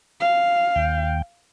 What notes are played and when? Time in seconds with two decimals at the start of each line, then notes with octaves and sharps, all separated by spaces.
0.21 F5
0.76 D#2 G5